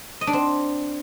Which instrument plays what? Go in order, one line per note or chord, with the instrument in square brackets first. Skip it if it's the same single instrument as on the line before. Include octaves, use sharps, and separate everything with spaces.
[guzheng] D#5
D4
C4